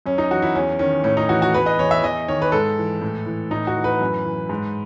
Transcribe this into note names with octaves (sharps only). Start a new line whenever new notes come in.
F#2 C#4
D#4
E3 F#4
E4
E2 C#4
D#3 C#4
A2 C#4
D#4
E3 F#4
F#4
E2 B4
D#5
E2 C#5
E5
E2 D#5
D#3 C#5
B4
G#2 A4
E3
A2
E3
A2 D#4
F#4
E3
B4
F#2
E3
G#2